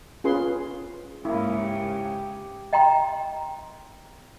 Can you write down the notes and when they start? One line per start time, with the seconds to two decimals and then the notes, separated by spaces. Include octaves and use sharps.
0.24 C#4 F4 G#4 B4 C6
1.25 G#2 C#3 A#3 E4
1.60 G4
2.73 D#5 G5 A#5 C6